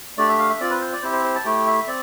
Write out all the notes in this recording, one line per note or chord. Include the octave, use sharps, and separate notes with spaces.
A3 D4 G4 D5
E5
F5
E5
C4 F4 D5
B4
C5
D5
C4 E4 G4 C5
C5
C5
A5
A3 E4 G4 G5
E5
C4 D5